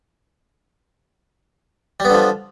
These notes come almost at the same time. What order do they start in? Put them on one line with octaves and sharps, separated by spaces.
G3 B3 D3 F3